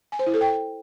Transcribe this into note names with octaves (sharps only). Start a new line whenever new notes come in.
G#5
C5
E4
A4
G5